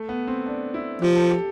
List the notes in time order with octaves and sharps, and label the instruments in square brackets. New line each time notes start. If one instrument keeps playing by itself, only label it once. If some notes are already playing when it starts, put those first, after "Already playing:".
Already playing: [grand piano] A3
B3
C4
D4
E4
[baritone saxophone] F3 [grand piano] G4
[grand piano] A4
G4